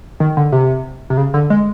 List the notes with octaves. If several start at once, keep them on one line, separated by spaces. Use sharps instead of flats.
D#3
D3
C3
C3
C#3
D3
G#3